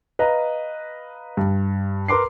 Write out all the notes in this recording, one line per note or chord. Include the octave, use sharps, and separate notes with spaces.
B4 D#5 F5 A#5
G2
A#4 B4 C6 D6 C7